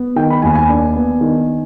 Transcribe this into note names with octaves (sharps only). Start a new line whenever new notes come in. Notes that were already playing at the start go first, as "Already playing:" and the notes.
Already playing: B3
D#3 G5
B5
D#2 G#5
B5
G#5
D4
B3
D#3